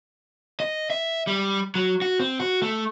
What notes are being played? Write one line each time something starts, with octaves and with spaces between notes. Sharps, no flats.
D#5
E5
G3
F#3
F#4
C4
F#4
A3